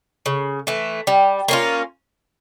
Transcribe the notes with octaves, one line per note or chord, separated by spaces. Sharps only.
C#3
E3 A3
G3
A#3 C#4 F4